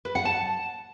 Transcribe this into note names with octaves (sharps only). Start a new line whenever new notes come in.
B4
F#5
A5